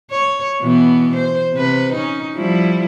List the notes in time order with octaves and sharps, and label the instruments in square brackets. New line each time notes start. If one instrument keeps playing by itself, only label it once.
[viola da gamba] C#5
B2 E3 B3
C5
C3 B4
C#4 D#4
F3 G3 E4